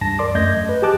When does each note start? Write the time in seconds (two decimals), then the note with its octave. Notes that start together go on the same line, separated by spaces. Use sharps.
0.01 C#2 G2 A5 A#6
0.19 A#4 D5 C6 D6
0.35 F#2 A3 D#5 G6 G#6 A#6
0.54 D#5
0.69 B4
0.82 G4 G#4 A5 D6 F#6